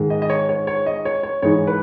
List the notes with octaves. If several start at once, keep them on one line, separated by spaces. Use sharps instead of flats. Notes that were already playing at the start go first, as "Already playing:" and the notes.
Already playing: G#2 D#3 G#3
D#5
D#5
C#5
C#5
C#5
D#5
C#5
C#5
G#2 E3 G#3 D#4 C#5
B4